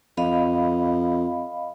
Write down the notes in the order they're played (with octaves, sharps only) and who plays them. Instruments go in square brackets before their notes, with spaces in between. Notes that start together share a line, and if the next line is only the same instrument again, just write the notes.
[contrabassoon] F2 [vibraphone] D#5 F5 B5